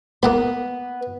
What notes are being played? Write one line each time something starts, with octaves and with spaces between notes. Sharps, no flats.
A#3 B3 F#5 B5